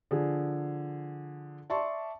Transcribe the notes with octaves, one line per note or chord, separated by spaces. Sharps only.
D3 F3 G#4
D5 E5 A5 C6 C#6